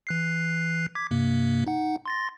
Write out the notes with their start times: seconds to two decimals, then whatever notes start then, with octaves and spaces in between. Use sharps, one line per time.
0.07 E3 F#6 C7
0.95 D6 G#6 B6
1.11 G2 C3 A#3
1.67 D#4 F#5
2.06 C6 A6 A#6